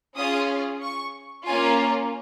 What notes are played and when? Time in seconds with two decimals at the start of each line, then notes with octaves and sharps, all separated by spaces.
0.15 C#4 F4 G#4 D#6
0.82 C#6
1.46 A#3 C#4 F4 G#5